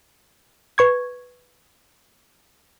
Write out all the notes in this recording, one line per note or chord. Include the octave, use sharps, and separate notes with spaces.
B4 C#6 G#6